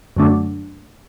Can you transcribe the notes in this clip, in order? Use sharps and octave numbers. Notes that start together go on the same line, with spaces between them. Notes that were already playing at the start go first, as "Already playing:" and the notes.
F#2 D3 F#3 A3 D4